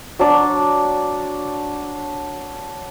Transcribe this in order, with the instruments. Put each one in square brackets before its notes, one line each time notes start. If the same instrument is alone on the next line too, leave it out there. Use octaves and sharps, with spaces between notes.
[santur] F#3 D4